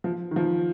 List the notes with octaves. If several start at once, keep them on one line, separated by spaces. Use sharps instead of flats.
F3
D#3
F3